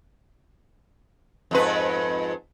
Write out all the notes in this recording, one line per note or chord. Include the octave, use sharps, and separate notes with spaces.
F2 G#2 B4